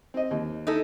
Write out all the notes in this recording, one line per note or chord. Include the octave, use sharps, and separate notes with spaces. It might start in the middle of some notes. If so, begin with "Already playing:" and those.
C4 D#5
D#2
D#4 E4 A4